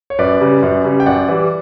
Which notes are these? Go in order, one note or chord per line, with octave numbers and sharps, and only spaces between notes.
C#5
F#2 B4 D5
C#3 G3
F#2
C#3 G3
G5
F#2 D5 F#5
E3 G3